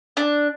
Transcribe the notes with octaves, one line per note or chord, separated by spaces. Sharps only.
D4